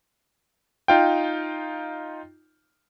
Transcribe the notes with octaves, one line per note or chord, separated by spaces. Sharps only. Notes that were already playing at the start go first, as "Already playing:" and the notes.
D#4 F4 G5